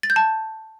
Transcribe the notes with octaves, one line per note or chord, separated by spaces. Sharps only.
A6
G6
A5